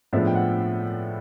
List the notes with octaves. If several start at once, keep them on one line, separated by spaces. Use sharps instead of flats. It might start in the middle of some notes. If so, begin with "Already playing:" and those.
A2 F3 G#3 B3 D4 E5
G5
F#5